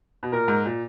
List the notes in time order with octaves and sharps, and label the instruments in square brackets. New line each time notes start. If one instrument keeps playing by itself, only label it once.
[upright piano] B2
[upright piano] A#2 [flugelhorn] A#4
[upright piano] G#2
A#2